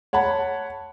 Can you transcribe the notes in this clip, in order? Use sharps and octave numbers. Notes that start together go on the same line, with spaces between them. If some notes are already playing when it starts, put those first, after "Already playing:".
C#5 F#5 A5 B5